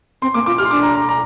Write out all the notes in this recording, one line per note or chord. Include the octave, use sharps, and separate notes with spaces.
C4 C6
A#3 D6
F4 D6
G4 F6
C6
D4 D6
A#5
A#5
A#5